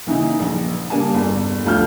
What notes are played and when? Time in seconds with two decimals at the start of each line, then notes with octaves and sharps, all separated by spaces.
0.07 D#2 C#3 E3 D#4
0.40 A#1
0.90 C#3 G3 A#3 G#5 A5
1.14 G1 E2
1.65 F1 D2 F4 A5 F6 G6